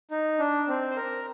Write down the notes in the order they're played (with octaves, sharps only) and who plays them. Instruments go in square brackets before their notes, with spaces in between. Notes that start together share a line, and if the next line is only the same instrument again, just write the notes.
[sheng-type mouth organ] D#4
D4
C4
C5
A#4